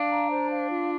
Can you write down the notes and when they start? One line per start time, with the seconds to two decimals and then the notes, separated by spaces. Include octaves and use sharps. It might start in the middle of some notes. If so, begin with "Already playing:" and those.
Already playing: D4 F5
0.10 A#5
0.30 C5
0.49 F5
0.69 F4